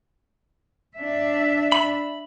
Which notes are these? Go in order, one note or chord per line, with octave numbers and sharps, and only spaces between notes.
D4 E5
B5